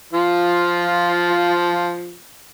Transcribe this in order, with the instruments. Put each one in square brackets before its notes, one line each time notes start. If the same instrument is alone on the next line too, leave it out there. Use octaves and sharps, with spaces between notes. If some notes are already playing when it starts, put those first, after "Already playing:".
[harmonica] F3 F4